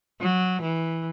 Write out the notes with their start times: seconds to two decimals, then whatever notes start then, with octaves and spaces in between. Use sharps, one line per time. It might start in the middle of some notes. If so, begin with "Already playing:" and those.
0.21 F#3
0.62 E3